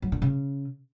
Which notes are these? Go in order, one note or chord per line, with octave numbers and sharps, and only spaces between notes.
F#3
D3
C#3